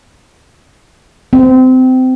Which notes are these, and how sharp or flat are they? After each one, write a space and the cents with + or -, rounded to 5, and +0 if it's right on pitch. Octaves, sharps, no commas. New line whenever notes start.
C4 -25